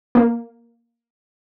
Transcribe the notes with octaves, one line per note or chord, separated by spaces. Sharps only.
A#3